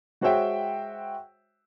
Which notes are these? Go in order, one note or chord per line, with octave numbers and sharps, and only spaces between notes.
G#3 F#4 C5 C#5 E5 G5